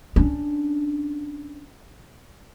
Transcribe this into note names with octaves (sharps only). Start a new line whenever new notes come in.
C#4 D4